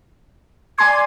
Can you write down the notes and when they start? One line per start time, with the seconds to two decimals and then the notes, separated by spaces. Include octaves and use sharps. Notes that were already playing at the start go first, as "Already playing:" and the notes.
0.78 D5 G#5 C6 G#6